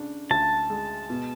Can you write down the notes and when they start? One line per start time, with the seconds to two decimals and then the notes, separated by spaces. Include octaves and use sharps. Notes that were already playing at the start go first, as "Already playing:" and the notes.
Already playing: C#3 D4
0.30 D2 A5
0.70 G#3
1.10 B2